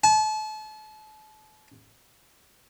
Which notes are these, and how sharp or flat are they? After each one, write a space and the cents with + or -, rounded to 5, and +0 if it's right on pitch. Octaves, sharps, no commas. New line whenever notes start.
A5 -35